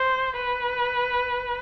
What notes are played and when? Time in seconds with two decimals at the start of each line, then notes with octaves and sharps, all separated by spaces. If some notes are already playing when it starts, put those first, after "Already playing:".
Already playing: C5
0.36 B4